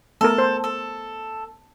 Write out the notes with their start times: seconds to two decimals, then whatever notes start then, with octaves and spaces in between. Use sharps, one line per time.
0.21 A3 B3 A4 A#4
0.38 C5
0.64 A4